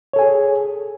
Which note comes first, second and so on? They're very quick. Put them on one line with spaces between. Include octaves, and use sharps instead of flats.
C#5 A4 G#5 G#4